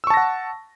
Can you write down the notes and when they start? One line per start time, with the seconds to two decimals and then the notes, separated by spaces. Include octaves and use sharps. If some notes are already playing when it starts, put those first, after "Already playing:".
0.04 E6
0.07 C#6
0.10 A5
0.14 A#6
0.17 F#5